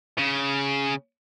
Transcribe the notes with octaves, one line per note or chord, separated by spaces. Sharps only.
C#3